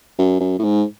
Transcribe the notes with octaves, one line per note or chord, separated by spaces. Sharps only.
F#2
F#2
A2
G#2